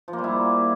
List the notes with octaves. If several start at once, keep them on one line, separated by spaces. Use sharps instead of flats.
F3
A#3
G3
E4